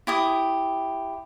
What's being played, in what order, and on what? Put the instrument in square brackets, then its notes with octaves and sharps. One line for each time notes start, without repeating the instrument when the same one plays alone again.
[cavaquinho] E4 G4 D#6